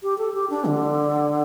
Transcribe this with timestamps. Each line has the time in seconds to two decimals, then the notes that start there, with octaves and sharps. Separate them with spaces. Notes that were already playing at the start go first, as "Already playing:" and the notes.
0.03 G4
0.18 A4
0.34 G4
0.50 D4
0.65 D3